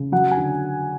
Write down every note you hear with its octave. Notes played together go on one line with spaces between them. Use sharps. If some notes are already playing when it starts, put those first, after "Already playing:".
Already playing: C#3
F#3 F#5
G#5
D3